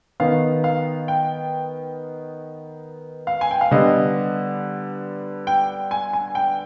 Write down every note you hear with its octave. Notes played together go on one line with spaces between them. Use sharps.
D#3 B3 F5
F5
G5
F5
G#5
G5
F5
D3 G3 B3 D#5
G5
G#5
G#5
G5